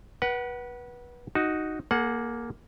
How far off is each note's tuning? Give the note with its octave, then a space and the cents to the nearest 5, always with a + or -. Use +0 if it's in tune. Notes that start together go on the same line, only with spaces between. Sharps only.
B4 -25 F#5 +20
D#4 +0 F#4 +0
A#3 +5 G#4 +45 F#5 -5